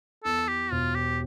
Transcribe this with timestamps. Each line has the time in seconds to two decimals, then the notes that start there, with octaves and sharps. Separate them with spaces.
0.24 E2 A4
0.48 G4
0.71 E1 F4
0.95 G4